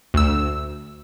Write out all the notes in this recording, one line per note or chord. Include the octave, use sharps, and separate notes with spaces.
D2 E6